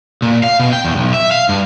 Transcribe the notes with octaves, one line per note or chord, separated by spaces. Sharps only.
A#2
F5
B2
G5
E2
B1
E5
F5
G2